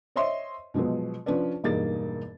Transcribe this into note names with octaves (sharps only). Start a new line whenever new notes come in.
C5 C#5 D#5 E5 C6
B2 F3 F#3 G#3 B3
F3 C#4 D4 B4 D5
E1 G2 A#3 D#4 G#4 A6